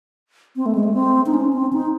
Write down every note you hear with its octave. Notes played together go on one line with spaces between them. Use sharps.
C4
A3
G#3
A3
C4
D#4
C#4
C4
D#4